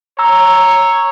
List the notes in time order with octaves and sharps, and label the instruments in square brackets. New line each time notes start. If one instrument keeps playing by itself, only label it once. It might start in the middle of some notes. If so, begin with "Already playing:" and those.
[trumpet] C#5 [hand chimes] A#5 E6